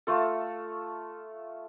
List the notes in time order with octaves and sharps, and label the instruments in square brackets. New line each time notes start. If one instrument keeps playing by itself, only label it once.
[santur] A3 F4 A4